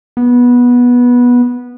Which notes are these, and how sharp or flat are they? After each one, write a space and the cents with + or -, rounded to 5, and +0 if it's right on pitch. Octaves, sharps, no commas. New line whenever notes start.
B3 -15